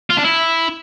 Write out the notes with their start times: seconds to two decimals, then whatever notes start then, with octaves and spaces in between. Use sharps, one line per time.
0.10 F4
0.17 D4
0.25 E4